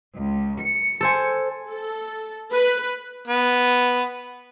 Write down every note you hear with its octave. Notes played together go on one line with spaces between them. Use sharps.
C#2
C#7
A4 C5 G#5
A4
B4
B3